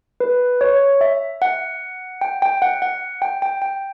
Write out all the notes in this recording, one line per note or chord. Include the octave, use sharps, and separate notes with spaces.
B4
C#5
E5
F#5
G5
G5
F#5
F#5
G5
G5
G5